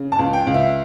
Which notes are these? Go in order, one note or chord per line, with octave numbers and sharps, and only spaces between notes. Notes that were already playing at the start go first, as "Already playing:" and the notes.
Already playing: C#3
A5
C#2
G5
C#2
E5